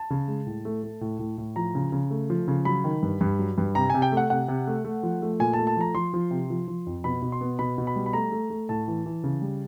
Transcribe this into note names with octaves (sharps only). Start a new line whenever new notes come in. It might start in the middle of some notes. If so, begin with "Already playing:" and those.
Already playing: A5
C#3
G#3
A2
A3
A3
A2
A2
A2
F3 A#5
C#3
C#3
A3
F3
C#3
F#3 B5
D#3
G2
G2
F#3
G2
C3 A#5
C3 G#5
G5
A3
F#5
C3 F#5
C3
A3
A3
F3
A3
A#2 G#5
A5
A3
A5
F3 A#5
F3 C6
F3
C3
F3
F3
F2
B2 B5
B2
C6
B3
B2 B5
B2
B5
G3
B5
A3 A#5
A3
A3
A2 A5
E3
E3
C#3
G3